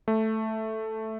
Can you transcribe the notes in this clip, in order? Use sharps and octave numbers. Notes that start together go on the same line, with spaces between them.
A3